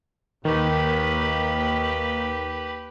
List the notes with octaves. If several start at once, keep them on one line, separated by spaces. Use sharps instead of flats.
D#2 D#3 A#3 G4 B4